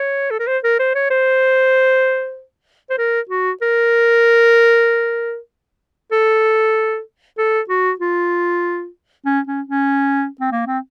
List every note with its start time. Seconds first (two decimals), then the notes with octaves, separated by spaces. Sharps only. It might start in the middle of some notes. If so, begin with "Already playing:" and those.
Already playing: C#5
0.31 A4
0.40 A#4
0.47 C5
0.64 A#4
0.79 C5
0.95 C#5
1.10 C5
2.90 C5
2.98 A#4
3.29 F#4
3.62 A#4
6.12 A4
7.38 A4
7.70 F#4
8.00 F4
9.25 C#4
9.47 C#4
9.68 C#4
10.41 C4
10.52 A#3
10.67 C4